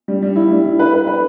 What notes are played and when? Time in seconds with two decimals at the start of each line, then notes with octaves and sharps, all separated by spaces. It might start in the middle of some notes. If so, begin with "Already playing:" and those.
0.08 G3
0.22 G3
0.36 E4
0.51 G3
0.65 E4
0.79 B4
0.93 B4
1.07 B4